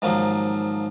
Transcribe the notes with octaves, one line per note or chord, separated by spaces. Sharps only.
G#2 D#3 F3 F#3 A#3